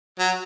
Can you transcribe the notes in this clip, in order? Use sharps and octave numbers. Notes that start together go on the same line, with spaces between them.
F#3